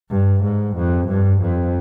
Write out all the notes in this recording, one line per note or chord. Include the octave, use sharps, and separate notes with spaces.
G2
G#2
F2
G2
F2